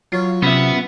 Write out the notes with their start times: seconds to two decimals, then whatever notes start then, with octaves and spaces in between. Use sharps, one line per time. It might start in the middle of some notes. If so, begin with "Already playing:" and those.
0.12 F#3 F4 C#5
0.42 C3 B3 C#4 F4 E5